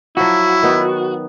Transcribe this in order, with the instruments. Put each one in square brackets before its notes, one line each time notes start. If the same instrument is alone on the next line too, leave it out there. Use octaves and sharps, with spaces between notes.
[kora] F3 F#3 [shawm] E4 [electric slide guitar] F#4
[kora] D#3 B3